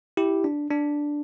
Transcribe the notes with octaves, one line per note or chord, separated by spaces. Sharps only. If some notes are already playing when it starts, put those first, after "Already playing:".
E4 G4
D4
D4